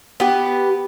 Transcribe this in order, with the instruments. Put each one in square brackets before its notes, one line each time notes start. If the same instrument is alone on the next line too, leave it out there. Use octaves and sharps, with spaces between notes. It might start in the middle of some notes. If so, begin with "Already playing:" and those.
[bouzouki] B3 G4